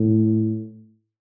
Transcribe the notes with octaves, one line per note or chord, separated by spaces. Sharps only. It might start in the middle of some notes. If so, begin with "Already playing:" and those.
Already playing: A2